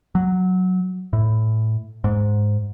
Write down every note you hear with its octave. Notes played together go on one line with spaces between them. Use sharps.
F#3
A2
G#2